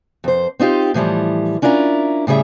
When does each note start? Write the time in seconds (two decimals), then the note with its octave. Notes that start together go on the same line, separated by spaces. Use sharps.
0.24 F2 C5
0.59 C4 D#4 F4 G4
0.94 A2 E3 F3 G3
1.62 C#4 D4 E4 F4 A#4
2.27 A2 C#3 G3 G#4 E5